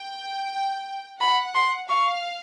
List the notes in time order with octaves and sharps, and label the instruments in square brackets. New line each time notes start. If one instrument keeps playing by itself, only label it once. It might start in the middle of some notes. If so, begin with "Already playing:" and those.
Already playing: [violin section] G5
[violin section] F#5 [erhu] B5
[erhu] C6
[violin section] F5 [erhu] C#6